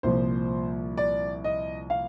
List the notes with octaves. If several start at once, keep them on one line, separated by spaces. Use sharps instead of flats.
C2 A#2 F3 C5
D5
D#5
F5